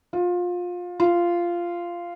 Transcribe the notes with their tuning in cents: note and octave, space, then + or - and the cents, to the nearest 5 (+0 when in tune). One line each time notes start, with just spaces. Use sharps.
F4 +25
F4 -10